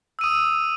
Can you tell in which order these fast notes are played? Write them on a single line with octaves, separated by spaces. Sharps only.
E6 D#7 D#6